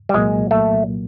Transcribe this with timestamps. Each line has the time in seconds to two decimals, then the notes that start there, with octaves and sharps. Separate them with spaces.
0.09 G3
0.14 C2 A#2 F#3 G#3 A#3
0.51 A3